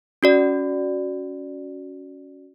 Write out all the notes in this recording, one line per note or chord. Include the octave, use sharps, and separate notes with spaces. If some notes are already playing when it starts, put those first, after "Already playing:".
C#4 F#4 D5